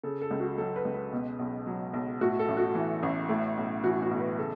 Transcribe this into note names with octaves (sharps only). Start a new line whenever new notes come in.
C#3 A4
A4
C#2
F#4
F#3 A4
B4
C#2
B4
B2
B1
F#3
B1
A2 F#4
A4
A1
F#4
E3
A1
A2
B1
E3 F#4
F#4
B1
B4
C#3 A4